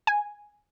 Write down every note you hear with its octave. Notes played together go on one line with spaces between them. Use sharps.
G#5